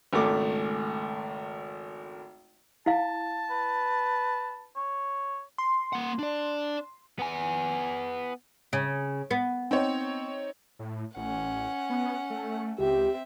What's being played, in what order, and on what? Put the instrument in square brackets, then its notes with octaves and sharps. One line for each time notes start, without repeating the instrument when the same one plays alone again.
[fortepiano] G#1 C#2 A3 D6
[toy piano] E4 F5 [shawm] A5
[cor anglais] B4
C#5
[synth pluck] C6
[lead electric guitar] A#3 F#5
D4 D5
[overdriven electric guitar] B3 G#5
[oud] C#3
B3
[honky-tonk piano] C4 D#4 C#5
[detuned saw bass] A2
[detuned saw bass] A1 [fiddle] C#4 F#5
[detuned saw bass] B3
A3
[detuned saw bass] C#2 [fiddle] C4 E5 [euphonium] G4